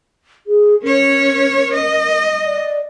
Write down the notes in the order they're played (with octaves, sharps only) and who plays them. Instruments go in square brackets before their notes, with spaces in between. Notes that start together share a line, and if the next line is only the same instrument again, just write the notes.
[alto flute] G#4
[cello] C#4 C#5 [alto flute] A#4
[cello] D#5
[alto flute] D5